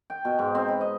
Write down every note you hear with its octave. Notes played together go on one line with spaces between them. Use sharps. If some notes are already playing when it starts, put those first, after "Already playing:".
G5
B2
G#2
C4
B5
D#5